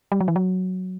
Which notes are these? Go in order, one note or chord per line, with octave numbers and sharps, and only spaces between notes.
G3
F#3
E3
F#3